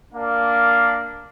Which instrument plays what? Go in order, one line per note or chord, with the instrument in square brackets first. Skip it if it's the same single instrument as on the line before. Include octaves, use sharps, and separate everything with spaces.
[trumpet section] A#3 D4 A#4 F5